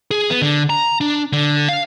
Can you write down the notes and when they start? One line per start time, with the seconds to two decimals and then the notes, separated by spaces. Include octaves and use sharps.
0.11 G#4
0.30 B3
0.42 D3
0.70 A#5
1.01 D4
1.33 D3
1.69 F5